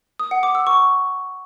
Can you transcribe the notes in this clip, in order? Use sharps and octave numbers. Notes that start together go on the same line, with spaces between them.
D#6
F#5
D6
E6
C#6